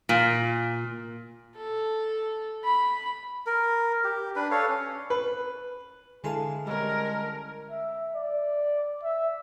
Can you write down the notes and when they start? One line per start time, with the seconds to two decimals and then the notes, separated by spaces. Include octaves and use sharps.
0.09 A#2
1.56 A4
2.64 B5
3.46 A#4
4.04 G4
4.36 D4 B4
4.51 A4 C#5 F5
4.69 C#4
5.10 B4
6.24 D3 E3 G#3 G#4 A4 F5 A5
6.67 G3 G#3 C#4 A#4
7.71 E5
8.15 D5
9.04 E5